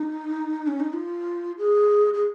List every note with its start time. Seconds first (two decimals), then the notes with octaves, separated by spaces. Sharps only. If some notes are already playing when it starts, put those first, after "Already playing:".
Already playing: D#4
0.67 C#4
0.80 D#4
0.93 F4
1.58 G#4
2.14 G#4